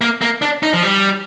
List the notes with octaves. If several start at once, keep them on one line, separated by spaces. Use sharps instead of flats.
A#3
A#3
D4
D#4
F3
G3